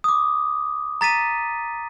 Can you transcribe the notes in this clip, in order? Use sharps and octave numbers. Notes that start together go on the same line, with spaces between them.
D6 D#6
A#5 A6 B6 D#7